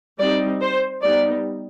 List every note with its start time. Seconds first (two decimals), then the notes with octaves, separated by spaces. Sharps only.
0.20 G3 C4 D#4 D5
0.61 C5
1.02 G3 B3 D#4 D5